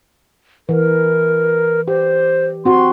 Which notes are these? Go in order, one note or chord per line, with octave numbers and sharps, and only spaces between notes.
E3 A#4
G4 C5
C4 F#4 C6